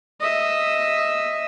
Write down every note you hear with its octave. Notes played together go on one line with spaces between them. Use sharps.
D#5 E5